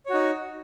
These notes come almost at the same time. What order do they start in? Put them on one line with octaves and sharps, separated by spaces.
C#5 F#4 D#4